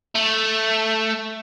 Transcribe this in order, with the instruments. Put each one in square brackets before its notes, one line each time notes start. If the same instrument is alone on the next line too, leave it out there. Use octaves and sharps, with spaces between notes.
[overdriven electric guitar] A3